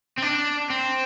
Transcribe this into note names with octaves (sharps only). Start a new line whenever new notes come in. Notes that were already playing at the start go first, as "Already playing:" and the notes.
C4
D4
C4